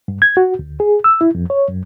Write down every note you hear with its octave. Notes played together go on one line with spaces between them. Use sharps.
G2
G#6
F#4
D2
G#4
E6
E4
F2
C#5
F#2